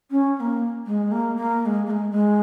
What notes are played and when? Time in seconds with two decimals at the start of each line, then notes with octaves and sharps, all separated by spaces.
0.11 C#4
0.36 C#4
0.40 A#3
0.86 G#3
1.12 A#3
1.36 A#3
1.61 A#3
1.66 G#3
1.86 A#3
1.90 G#3
2.11 G#3